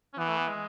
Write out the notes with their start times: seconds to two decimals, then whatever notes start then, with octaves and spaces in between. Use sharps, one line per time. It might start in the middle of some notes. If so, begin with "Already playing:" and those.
0.13 C#4
0.18 E3 B3
0.28 A3
0.37 B3
0.47 G#3